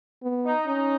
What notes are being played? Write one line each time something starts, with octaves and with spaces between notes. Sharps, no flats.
B3
D#4
C#4 D#4